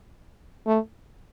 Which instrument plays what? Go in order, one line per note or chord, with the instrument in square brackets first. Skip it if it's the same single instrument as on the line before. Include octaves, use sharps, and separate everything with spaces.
[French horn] A3